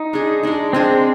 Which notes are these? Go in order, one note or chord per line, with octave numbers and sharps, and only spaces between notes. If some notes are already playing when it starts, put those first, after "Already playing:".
Already playing: D#4
G#3 D4 G#4
G#3 D4 G#4
G#3 C4 D4 G#4